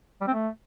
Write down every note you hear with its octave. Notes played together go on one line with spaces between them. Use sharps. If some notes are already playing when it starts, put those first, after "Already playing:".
G3
C4
A3